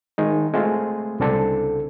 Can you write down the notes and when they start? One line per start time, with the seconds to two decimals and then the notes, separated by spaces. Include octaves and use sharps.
0.18 D#3 G#3 D#4
0.53 G#3 A3 C4 F4
1.20 C2 C#3 C4 D4 A4